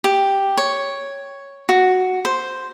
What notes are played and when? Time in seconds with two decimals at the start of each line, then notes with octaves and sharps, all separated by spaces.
0.04 G4
0.57 C#5
1.69 F#4
2.25 C5